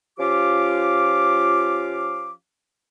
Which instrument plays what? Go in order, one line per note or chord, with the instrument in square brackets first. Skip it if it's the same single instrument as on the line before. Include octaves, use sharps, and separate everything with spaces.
[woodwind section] F3 C#4 F4 G4 F5 D6